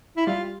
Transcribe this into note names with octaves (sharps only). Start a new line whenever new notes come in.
E4
G3 F4